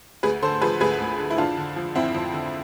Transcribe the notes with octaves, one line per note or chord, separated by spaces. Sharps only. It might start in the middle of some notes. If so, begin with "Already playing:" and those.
D2 G#4 B4
D3 A4 C5
F3 G#4 B4
D2 G#4 B4
D2
D3
E4
F2 D4 F4
D3
F3
F2 C4 E4
F2
D3